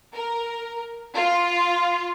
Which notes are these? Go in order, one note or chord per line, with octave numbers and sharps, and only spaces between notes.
A#4
F4